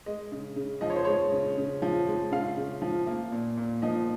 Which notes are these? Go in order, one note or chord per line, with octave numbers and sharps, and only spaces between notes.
G#3 D#5
C#3
C#3
F3 D#5
C#5
C5
G#3 C#5
C#3
C#3
F3
G#3
C#3 F5
C#3
F3
A#3
A#2
A#2
F3 D#5